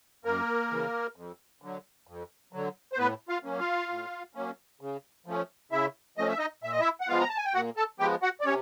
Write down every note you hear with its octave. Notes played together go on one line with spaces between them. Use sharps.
F#2 A#3 A#4
C#3 E3
F2
D3 F#3
F2
D3 F#3
C5
A2 B3 B4
F4 F5
F#3 A#3 C#4
F4 F5
A2
F#3 A#3 C#4
C#3
F3 A3 C#4
C#3 E4 E5
F3 A3 C#4 D#5
E5
D#4 D#5
A#2 E5
D#5
E4 E5
F#5
F3 G#3 B3 F4 F5
A#5
A5
G#5
G5
A#2 F#4 F#5
A4 A5
F3 G#3 B3 G4 G5
F#4 F#5
D5
C3 C#4 C#5